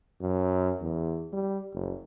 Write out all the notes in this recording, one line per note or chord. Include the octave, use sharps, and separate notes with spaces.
F#2
E2
G3
F#1